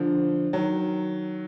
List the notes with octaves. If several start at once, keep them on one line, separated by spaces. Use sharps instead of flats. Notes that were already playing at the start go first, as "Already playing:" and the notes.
Already playing: D3 F3
D#3 F#3